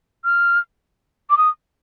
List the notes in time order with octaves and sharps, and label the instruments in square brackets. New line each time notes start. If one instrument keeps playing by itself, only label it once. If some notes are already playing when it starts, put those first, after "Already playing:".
[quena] F6
D6
D#6